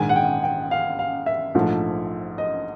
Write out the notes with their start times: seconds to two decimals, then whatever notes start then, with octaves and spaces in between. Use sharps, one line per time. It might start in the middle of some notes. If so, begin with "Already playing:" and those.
Already playing: A#1 G#2 D#3 G#3 G#5
0.09 F#5
0.16 G5
0.44 G5
0.71 F5
0.99 F5
1.26 E5
1.55 A#1 G#2 F3 A3
2.38 D#5